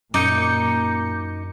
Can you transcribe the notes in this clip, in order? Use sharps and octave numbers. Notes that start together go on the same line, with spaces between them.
F#2 A#2 D#4 D6 G6 C#7